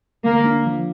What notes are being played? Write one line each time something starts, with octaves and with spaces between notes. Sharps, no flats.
D3 A#3
D4
F3